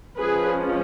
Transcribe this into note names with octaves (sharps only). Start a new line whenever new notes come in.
F3 G#3 C#4 G#4 B4